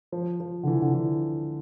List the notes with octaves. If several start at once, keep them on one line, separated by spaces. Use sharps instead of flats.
F3
F3
D3
E3
D3
E3